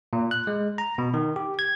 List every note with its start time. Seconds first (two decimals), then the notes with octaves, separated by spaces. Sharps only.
0.13 A#2
0.31 F#6
0.47 G#3
0.78 A#5
0.98 B2
1.14 D#3
1.36 G4
1.59 G#6